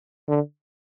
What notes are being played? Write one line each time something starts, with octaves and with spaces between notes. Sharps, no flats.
D3